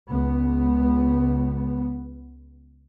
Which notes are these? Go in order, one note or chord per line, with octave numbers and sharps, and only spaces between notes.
C#2 B3